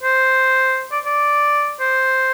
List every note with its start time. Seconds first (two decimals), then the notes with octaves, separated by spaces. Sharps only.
0.03 C5
0.92 D5
1.05 D5
1.80 C5